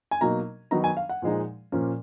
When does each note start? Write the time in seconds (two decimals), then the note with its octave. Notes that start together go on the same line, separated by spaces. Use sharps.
0.11 G#5
0.21 B2 F#3 A#3 D#4 A#5
0.71 D#3 F#3 B3 D#4 A#5
0.84 G#5
0.97 F5
1.09 F#5
1.22 A#2 F3 G#3 D#4
1.72 A#2 F3 A#3 C#4